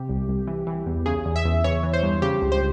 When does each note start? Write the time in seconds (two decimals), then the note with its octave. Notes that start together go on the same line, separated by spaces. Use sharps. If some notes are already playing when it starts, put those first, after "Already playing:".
Already playing: C3 G4
0.09 C2
0.28 C2
0.47 E3
0.67 E3
0.86 E2
1.06 C#3 G#4
1.25 E2
1.36 E5
1.45 E2
1.64 E3 C#5
1.83 E3
1.93 C5
2.03 G2
2.22 C#3 G4
2.42 C#2
2.52 C5